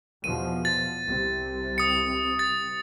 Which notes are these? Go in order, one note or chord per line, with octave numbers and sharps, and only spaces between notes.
E2 B2 F3 D#7
A6
C2 C3
D#6 C#7
A6